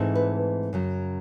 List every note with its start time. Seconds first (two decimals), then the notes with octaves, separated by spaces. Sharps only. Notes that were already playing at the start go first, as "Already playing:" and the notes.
Already playing: G#2 E3 A3 C4 D#4
0.15 B4
0.73 F#2 C#3 F#3